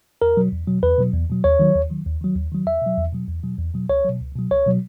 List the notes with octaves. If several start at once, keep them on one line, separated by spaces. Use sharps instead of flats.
E2 A#4
B2 F#3
E2
B2 F#3
E2 B4
B2 F#3
E2
B2 F#3
D#2 C#5
D#3 F#3
D#2
D#3 F#3
D#2
D#3 F#3
D#2
D#3 F#3
E2 E5
B2 F#3
E2
B2 F#3
E2
B2 F#3
E2
B2 F#3
C#2 C#5
B2 F#3
C#2
B2 F#3
C#2 C#5
B2 F#3